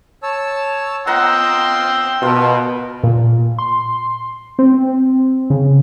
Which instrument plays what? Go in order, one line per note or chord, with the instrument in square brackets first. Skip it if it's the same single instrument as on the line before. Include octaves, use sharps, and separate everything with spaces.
[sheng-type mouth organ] C#5 A5 E6
[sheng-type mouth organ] F4 D#5 [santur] F#5 A#5 [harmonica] G5 C6 E6
[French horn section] B2 [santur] F4 A5 [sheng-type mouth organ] A#4 B4
[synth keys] A#2
C6
C4
C#3